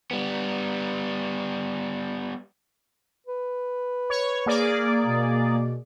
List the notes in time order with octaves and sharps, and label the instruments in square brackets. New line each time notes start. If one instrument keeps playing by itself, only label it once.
[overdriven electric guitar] G3 B3
[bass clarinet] B4
[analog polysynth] C#5
A#3 G#4 D5
[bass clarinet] B2